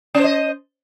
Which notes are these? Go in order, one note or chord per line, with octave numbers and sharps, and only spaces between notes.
C#4 C5 D#5